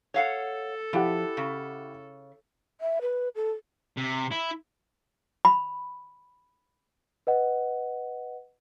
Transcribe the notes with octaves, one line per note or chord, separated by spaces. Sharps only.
A4 C#5 F5 F#5
F3 E4 G4 F#5
C#3
E5
B4
A4
C3
E4
B5
B4 D#5 F#5